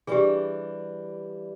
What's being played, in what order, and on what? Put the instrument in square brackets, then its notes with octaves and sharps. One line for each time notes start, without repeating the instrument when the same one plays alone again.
[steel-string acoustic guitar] E3 G3 D4 [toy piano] G4 G#4